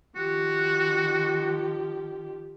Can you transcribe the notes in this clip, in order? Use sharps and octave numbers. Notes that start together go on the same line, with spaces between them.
D#3 F3 F#4 G4